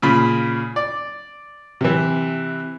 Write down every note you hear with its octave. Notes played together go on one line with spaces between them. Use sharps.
A#2 C#3 B5
D5
C3 E3